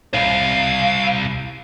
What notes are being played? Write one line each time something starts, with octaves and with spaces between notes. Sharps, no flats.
C2 F5